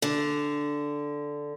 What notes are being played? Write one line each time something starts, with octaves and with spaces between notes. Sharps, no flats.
D3